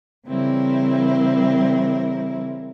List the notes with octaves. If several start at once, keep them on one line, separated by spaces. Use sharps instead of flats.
C#3 E3 G3 C4 E4 A#4